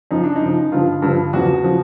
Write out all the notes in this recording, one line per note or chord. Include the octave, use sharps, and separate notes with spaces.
F#2 C#3 F3 D#4
D4
D#4
F#2 C#3 F3
G2 D3 F3 F4
G2 D3 F3
E2 C#3 F3 F#4
C#3 F3